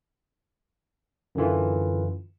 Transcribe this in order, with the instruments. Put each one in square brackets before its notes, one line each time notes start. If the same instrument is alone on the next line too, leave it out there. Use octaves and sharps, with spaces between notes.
[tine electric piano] F#2 D3 E3 F4